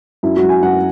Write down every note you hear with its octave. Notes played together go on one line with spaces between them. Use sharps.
F#2 E4
F#4
F#3
G#5
F#2 F#5